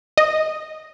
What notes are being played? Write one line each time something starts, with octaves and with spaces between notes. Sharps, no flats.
D#5